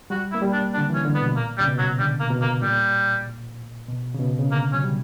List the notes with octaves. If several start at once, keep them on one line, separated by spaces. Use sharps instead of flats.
G3 F#4
E4
A#3
G3
D4
D4
D3
E3
C#4
D3
B3
B2
A#2 A#3
G3
C#3
B2
F#3
D3 G3
A#3
B2
A#3
A#2 G3
B2
C#3
B2
C#3
D3 A#3
F#3 C#4
G3